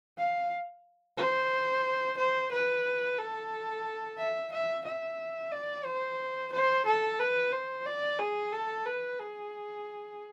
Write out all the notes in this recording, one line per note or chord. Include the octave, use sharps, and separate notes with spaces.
F5
C5
C5
B4
A4
E5
E5
E5
D5
C5
C5
A4
B4
C5
D5
G#4
A4
B4
G#4